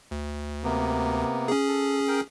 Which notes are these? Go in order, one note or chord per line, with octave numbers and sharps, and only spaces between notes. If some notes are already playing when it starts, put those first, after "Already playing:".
D2
C3 A#3 B3
C#4 G#4
A4
A#4 G5